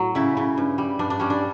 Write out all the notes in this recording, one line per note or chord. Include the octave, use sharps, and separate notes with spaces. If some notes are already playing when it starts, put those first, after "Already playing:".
Already playing: A2 F#3
C#3 E4
C#3
G2
G3
G2 D4
D4
G3 C#4
D4